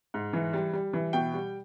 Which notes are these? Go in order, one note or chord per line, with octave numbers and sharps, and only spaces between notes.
G#2
E3
G3
G3
E3
B2 G5
G3